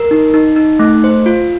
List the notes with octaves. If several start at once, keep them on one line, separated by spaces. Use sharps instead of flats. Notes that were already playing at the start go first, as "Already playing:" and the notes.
Already playing: A#4
D#4
D#4
D#4
A3
C5
F4